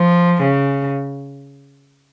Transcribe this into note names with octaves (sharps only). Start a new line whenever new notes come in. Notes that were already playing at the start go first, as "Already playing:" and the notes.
Already playing: F3
C#3